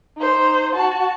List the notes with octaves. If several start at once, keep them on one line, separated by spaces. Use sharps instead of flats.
D#4 C5
F#4 A5